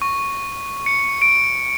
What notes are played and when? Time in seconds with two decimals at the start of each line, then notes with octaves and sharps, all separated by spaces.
0.02 C#6
0.86 C#7
1.22 D7